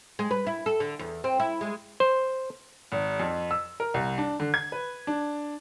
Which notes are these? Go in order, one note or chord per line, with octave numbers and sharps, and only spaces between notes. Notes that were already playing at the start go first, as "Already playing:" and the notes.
G#3
B4
E4
A4
D3
E2
C4
E4
G#3
C5
G#1
F2
E6
A#4
C2
D4
D3
G#6
B4
D4